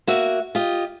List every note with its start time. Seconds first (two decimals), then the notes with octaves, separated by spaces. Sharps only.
0.07 A#3 F#4 E5
0.55 F4 G4 D#5